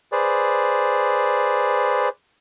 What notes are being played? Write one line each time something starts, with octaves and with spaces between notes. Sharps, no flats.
G#4 B4 C5 D5